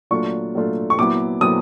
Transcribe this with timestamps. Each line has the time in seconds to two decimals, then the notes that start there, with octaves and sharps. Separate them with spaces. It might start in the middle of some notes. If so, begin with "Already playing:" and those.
0.11 A#2 F#3 A3 D4 F4 C#6
0.54 A#2 F#3 A3 D4 F4
0.90 C#6
0.98 A#2 F#3 B3 E4 D6
1.41 A#2 F#3 B3 E4 D#6